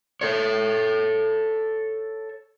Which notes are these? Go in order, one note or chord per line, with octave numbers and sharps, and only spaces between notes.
A4 C#5